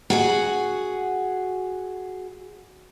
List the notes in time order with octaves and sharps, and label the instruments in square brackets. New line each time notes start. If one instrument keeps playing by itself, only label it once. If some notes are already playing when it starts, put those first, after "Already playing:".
[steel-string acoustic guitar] F#4 G#4 F#5